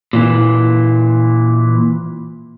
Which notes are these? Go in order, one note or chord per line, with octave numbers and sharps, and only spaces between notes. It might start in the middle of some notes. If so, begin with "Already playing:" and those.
A#2 E3